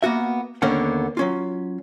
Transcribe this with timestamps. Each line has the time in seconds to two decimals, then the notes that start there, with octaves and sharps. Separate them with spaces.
0.03 A#3 B3 F#4 E5
0.62 D#2 D3 A#3 B3 C#4 F#5
1.17 F#3 C#4 F4